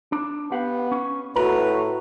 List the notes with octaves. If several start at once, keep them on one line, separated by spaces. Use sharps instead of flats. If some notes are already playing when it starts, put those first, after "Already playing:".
D4
B3 G4 F5 F#5
C#4
A2 F#4 B4 A#5